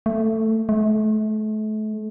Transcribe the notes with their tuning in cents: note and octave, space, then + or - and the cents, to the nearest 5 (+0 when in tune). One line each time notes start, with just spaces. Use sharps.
A3 +10
A3 -35